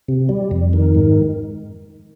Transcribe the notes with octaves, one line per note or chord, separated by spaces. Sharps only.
C3
G3
F2
D#3
G#2